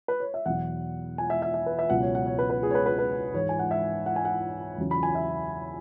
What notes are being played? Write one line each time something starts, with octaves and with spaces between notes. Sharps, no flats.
B4
C#5
E5
E2 B2 F#3 F#5
G#5
E5
E5
E5
B4
E5
C#2 B2 F#3 F#5
C#5
F#5
C#5
B4
B4
G#4
C#5
B4
B4
B4
G#2 E3 G#3 C#5
G#5
F#5
E5
F#5
G#5
F#5
E2 C#3 F#3
B5
G#5
E5